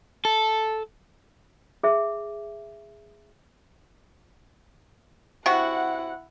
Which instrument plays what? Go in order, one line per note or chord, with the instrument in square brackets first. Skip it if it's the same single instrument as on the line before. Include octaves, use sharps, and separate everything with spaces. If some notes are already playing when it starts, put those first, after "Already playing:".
[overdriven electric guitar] A4
[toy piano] G#4 E5
[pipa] C3 F#4 [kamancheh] E4 F#5